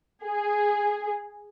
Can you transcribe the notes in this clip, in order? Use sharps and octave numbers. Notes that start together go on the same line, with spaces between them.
G#4